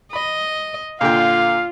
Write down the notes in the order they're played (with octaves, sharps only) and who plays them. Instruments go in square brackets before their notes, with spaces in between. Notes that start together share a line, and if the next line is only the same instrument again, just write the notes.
[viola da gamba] D#5 [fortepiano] B5
[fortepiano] A#2 D3 G5 [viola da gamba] F4 [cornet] F5